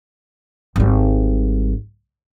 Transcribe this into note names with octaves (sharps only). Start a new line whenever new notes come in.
G#1 G3